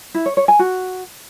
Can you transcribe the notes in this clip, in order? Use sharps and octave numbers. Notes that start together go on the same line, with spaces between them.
E4
C#5
C#5
G#5
F#4